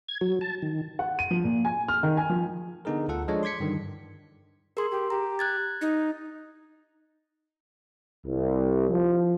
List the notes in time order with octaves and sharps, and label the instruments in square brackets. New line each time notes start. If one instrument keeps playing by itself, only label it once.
[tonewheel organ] G#6
F#3
A5
D#3
[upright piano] F#5
D#7
F3
A#2
G#5
F6
D#3
G#5
F3
[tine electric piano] D3 B3 D#4 G#4 A#4
D2 F4 A4 F#5
F3 G#3 D4 A4 C#5 D#5
C6 D6 G#6 B6 C#7
G2 D3 D#3
[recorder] G#4 [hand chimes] A#4 C6
[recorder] G4
[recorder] G4 [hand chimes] A#5
[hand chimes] F#6 G#6 A6
[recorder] D#4
[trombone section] C2
F3